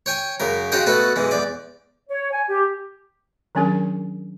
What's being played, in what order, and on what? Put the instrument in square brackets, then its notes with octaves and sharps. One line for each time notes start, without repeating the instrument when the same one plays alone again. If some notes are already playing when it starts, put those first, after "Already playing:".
[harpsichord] C#5 G5 G#5
F#2 C#3 A#4
C#3 F4 F#4 D#5 G5
B2 A3 F#4 A4 B4
B1 E3 G#3
E2 D5
[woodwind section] C#5
G#5
G4
[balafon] D#3 F#3 C#4 D4 G#4 A#4